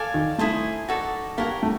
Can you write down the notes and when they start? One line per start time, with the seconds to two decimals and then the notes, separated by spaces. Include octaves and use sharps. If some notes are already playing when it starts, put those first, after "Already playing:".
Already playing: A4 D5 F5 G#5
0.14 D#3
0.38 A3 E4 G#4 C5
0.88 D#4 F#4 A4 D5
1.38 A#3 G4 A#4 C#5 F#5
1.63 A3